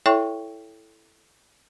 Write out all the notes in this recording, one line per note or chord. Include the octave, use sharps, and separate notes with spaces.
E4 A4 C#5 E5 G5 C#6